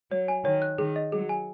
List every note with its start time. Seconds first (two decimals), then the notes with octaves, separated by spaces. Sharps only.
0.11 F#3 C#5
0.28 G#5
0.45 D#3 C#5
0.62 F#6
0.78 D#3 G#4
0.96 D#5
1.12 F#3 G#4
1.29 G#5